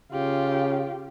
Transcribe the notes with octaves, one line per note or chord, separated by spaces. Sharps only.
C#3 F4 G4